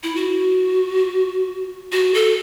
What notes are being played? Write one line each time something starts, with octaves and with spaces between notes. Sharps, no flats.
E4
F#4
F#4
A4